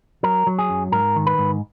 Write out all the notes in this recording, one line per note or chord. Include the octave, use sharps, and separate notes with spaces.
F#3 A#4
F#3
G#4
F#2
G#2 A#4
D#3
B4
G#2